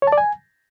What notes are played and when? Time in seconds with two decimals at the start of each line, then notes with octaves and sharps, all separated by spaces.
0.02 C#5
0.07 A5
0.12 D5
0.18 G#5